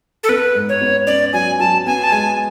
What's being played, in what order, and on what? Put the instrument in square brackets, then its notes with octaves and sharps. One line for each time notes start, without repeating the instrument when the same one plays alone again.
[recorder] A4
[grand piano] B3 [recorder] B4
[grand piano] G#2
[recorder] C#5
[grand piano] B3
[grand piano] C#4 [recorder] D5
[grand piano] F#3 [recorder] G#5
[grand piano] F#3 [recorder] A5
[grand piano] B3 [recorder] G#5
[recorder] A5
[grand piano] G#3 [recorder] G#5